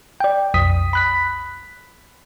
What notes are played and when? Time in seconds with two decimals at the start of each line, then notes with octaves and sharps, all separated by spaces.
0.20 D5 G5
0.54 B1 F2 D#6 B6
0.93 B5 F#6 B6